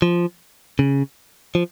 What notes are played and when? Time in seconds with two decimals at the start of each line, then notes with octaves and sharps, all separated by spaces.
0.02 F3
0.79 C#3
1.55 F3